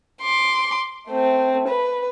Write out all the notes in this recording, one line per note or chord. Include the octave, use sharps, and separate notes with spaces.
C6 D6
A3 C4
B4